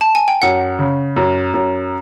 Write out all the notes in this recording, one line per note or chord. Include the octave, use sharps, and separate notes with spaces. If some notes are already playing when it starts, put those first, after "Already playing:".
A5
G#5
G5
F#2 F#5
C#3
F#2
F#2